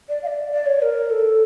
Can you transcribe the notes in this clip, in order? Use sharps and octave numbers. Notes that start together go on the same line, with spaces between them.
D5
F5
D5
D5
C#5
A#4
A4